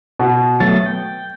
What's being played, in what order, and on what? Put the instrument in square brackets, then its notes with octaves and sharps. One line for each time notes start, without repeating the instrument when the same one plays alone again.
[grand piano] B2
[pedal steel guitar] F#3 A3 B3 [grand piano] A6
[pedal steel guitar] G5